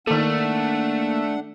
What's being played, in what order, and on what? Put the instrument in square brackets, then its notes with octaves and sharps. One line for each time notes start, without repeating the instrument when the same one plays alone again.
[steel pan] D#3 A4 [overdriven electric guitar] A3 [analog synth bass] A#3 [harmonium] D4 F#5